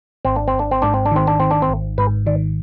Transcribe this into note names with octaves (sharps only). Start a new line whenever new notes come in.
G#1 C4
D4
C4
G#1
D4
C4
G#2 D4
C4
D4
D#3 C4
D4
D#3 C4
D4
C4
G#1
G#2 B4
D#3 D5